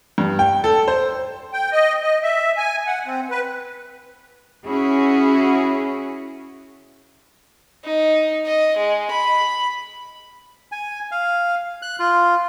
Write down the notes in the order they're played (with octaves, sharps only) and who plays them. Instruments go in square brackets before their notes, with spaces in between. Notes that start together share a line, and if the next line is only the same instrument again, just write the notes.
[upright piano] G2
G5
A4
C5
[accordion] G5
D#5
D#5
E5
G#5
F#5
C4
B4
[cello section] C#4 E4 F#4 G#4
[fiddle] D#4
D#5
G#3
B5
[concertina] G#5
F5
F#6
F4